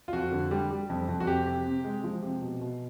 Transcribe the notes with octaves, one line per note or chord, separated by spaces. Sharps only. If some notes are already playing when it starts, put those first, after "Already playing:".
F4
F2 F#4
D3
G3
G3
F2
F2
F#4
C3 G4
C3
C3
G#3
F3
C3
B2
B2